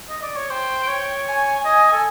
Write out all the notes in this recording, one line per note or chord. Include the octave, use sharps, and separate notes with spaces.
D#5
D5
C#5
C5 G5
C#5
G#5
D#5 G#5
A4